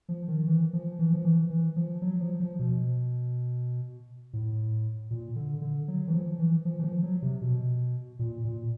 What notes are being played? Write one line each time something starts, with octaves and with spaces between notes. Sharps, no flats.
F3
D#3
E3
F3
E3
F3
E3
E3
F3
F#3
F3
F3
B2
A2
A#2
D3
D3
F#3
E3
F3
E3
F3
E3
F3
F#3
C3
B2
A#2
A#2